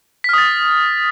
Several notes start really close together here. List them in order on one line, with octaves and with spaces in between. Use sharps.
B6 F6 D#6 A6